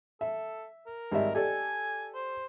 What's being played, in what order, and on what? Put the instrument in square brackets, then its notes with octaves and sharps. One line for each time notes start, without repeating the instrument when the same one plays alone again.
[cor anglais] A4 [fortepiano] E5
[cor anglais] A#4
[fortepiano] G#1 G3 E5
[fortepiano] G4 A4 D5 [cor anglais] G#5
[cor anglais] C5